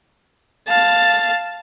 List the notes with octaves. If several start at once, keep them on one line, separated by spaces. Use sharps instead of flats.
F5 A5